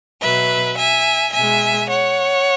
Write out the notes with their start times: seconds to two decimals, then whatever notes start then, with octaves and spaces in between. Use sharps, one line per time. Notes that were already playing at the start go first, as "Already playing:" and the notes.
0.21 B2 F#3 B4 E5
0.78 E5 G#5
1.33 B2 G#3 E5 G#5
1.90 C#5 F#5